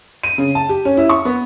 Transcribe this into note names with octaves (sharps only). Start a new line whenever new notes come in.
D#7
C#3
A5
G4
C#4
E4
C#6
B3